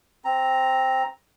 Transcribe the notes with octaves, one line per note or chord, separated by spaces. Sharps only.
C4 A#5